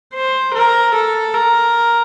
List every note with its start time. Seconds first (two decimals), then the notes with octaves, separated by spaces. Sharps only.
0.14 C5
0.54 A#4
0.94 A4
1.34 A#4